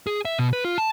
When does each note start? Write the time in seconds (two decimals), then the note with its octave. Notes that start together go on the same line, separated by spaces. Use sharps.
0.07 G#4
0.25 E5
0.39 B2
0.53 B4
0.65 F4
0.78 A5